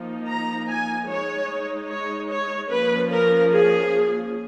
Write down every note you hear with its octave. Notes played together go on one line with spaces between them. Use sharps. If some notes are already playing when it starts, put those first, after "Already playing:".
Already playing: F3 A#3 D#4
A#5
G#5
G#3 D#4 C#5
C#5
C#5
F3 A#3 C#4 B4
A#4
G#4